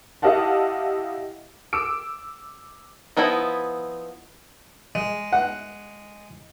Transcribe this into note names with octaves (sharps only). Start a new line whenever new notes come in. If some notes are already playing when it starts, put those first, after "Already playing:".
E4 G4 D#5 F5 F#5 A5
D6 E6 D7
F3 B3 D#4 E4
G#3
F#5